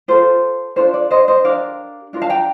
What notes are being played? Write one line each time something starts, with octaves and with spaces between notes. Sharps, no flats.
F4 A4 C5
D4 F4 A4 C5
D5
C5 D#5
C5 D#5
D4 G4 A#4 D5 F5
D4 F4 A#4
F5 A5
G5 A#5